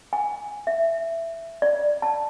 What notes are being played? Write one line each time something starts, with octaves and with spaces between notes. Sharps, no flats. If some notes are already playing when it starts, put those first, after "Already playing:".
G#5
E5
D5
A5